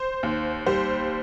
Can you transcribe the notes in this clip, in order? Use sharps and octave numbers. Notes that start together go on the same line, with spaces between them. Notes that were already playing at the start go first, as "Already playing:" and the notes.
Already playing: C5
D#2
G3 C5